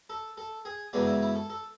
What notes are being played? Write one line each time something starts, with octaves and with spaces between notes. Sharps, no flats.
A4
A4
G#4
F#2 C#3 E3 G#3 B3 D4
E4
E4
A4
A4